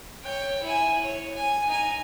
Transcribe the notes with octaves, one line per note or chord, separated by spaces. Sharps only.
C#5 G5
E4 G#5
C#5
G#5
D#4 G#5